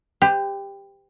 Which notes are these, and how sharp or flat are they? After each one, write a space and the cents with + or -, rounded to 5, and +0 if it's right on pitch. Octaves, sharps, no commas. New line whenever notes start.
G4 +15 C5 -45